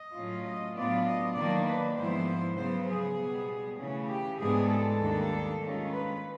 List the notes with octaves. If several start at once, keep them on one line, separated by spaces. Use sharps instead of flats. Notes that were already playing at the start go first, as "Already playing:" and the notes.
Already playing: D#5
A2 F#3 A3 C#4 F4
D#5
A2 F#3 B3 D4 F4 D5
D#5
D#3 F#3 A#3 D4 D5
B4
G#2 F3 G#3 B3 E4 C5
C#3 F#3 B3 C5
G#4
B2 G3 B3
C#3 E3 A3 C#4
G4
G#2 E3 G#3 B3 D4 G#4
A4
D#2 D#3 G3 A#3 D4
D#3 G#3 C#4 F4
B4